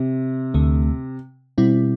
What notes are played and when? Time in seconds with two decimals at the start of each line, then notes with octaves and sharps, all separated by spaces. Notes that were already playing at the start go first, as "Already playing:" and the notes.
Already playing: C3
0.54 D2 D3 A3
1.58 B2 G3 C4 E4